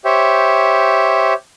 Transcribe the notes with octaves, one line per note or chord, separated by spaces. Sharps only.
G4 C5 C#5 E5